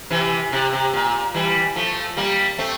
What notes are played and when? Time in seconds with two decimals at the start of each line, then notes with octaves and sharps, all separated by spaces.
0.10 C3 E3
0.52 C3
0.73 C3
0.93 A#2
1.34 E3 G3
1.76 F3 A3
2.17 G3 A#3
2.58 A3 C4